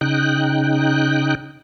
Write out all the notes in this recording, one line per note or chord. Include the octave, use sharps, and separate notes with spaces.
C#3 D#4 G5 F#6